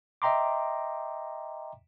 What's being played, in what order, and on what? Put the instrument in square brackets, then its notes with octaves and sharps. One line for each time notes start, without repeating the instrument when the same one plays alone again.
[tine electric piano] D#5 E5 G5 A#5 C6 D6